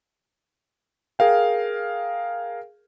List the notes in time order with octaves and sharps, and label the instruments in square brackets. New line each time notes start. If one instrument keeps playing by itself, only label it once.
[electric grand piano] G#4 A#4 F5 G5